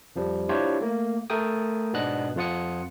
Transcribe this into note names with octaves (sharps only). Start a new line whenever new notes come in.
F2 F3 G3
D4 E4 F4 G4 C5 C#5
A3 A#3
A3 A4 A#4 G5 D#6
G#2 B2 B3 D4 D#5 F#6
F2 F3 F4 F#5 D#6 C#7